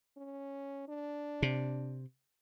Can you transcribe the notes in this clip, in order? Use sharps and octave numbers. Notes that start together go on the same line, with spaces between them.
C#4
D4
C3